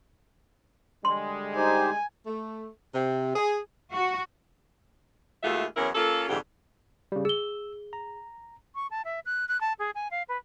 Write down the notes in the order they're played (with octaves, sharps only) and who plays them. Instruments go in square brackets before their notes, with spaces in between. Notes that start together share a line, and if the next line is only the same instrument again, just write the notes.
[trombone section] D3 G3 G#3 [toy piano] C6
[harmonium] D#4 G4 C5 [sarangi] G#5
[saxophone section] A3
C3
G#4
[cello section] F#4
[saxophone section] D#2 G#3 A3 F4 F#4 E5
E2 F#3 C#4 E4 A#4
A#3 C#4 F4 A4
F2 G#2 D3 E3 F4 G4
[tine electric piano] C#3 G3
[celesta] G#4 G7 [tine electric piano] E6
[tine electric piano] A#5
[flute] C#6
A5
E5
F#6
F#6
A5
G#4
G#5
F5
B4